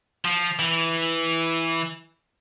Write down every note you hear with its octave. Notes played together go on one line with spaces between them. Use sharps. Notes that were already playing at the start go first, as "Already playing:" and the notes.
F3
E3